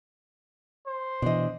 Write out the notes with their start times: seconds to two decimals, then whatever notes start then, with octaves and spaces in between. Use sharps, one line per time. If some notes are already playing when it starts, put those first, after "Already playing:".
0.86 C5
1.22 B2 E3 D4 D#5